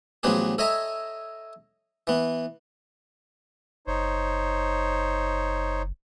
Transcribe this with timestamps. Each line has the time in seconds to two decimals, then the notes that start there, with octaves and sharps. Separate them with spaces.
0.23 A1 F3 F#3 B3 G4 G#4
0.58 A4 C#5 D#5 E5 G#5 A#5
2.07 E3 B3
3.87 F#1 D#4 C5 C#5